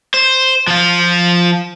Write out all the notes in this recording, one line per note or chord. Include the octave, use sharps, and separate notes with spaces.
C5
F3 F4